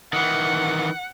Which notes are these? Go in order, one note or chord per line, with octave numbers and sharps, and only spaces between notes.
D#3 E3 F#5